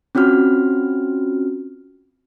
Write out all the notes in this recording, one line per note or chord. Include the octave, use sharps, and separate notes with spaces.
C4 C#4 F4 F#4 F6